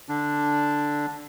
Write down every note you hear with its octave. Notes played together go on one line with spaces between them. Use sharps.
D3 D4